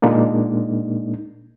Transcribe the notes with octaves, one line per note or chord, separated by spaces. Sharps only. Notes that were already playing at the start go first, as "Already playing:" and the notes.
A#2 G#3 A#3 D4 D#4